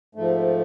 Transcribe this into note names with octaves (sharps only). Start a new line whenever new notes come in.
G#2 F3 A3